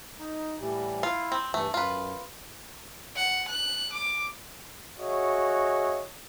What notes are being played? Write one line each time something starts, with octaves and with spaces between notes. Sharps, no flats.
D#4
A2 E3 G3
E4 F4
C4
G2 E3 A3
F#2 F4 B4
F#5
F#6
D6
F#4 G#4 C#5 D#5 E5